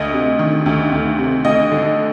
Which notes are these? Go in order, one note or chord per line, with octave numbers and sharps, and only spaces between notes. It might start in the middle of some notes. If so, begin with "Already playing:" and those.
Already playing: D2 D#5
C3
D#3
D2
D2
C3
D2 D#5
D3